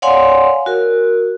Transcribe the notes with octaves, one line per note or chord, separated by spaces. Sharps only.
C#5 D5 F5 F#5 G#5 C6
F#4 A#4